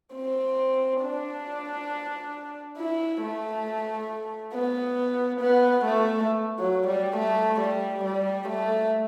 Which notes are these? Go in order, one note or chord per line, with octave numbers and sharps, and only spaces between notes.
C4
D4
E4
A3
B3
B3
A3
F#3
G3
A3
G3
G3
A3